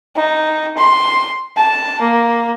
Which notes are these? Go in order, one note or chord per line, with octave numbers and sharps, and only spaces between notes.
D#4
C6
A5
A#3